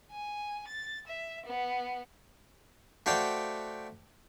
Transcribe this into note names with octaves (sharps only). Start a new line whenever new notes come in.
G#5
A6
E5
B3
A3 F#4 C5 D5 F5 G5